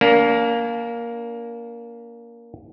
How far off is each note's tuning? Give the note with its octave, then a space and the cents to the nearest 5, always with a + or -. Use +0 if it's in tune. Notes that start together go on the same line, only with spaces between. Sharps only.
A#3 +5 D4 -40